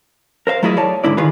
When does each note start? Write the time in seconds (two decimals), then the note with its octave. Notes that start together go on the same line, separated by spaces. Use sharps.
0.47 A#4 C5 E5 F5
0.63 F#3 A3 E4 F4 G#4 D#5
0.78 C#5 D5 A5
1.04 G#2 D3 E4 D5
1.17 D#3 F4 G#4 B4